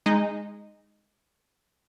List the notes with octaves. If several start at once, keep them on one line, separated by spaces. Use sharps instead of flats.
G#3 D#4